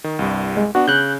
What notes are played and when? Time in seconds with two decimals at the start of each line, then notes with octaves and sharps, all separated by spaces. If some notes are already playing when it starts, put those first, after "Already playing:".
0.04 D#3
0.19 C2 G2
0.57 G#3
0.75 B3 D4 F#4 F#5
0.88 C#3 F#6 G6